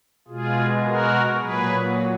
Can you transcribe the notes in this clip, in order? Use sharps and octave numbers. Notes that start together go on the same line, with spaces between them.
B2 G#3 F4 G#4
F#4 A#4
A#2 F#3 G#4 B4